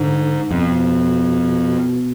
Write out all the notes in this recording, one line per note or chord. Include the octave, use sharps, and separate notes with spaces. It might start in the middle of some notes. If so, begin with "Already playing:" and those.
Already playing: G#2 D3
F2 B2